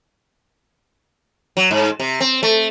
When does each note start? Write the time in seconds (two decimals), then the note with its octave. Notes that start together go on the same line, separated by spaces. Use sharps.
1.57 F#3
1.71 G#2
2.00 C3
2.21 C4
2.43 A3